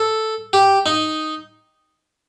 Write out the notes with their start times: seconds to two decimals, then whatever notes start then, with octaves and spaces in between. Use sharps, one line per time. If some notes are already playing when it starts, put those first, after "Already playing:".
Already playing: A4
0.53 G4
0.86 D#4